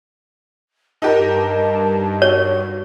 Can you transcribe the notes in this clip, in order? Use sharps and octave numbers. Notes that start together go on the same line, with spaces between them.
G2 D#4 G4 A#4 A5
F#4 C#5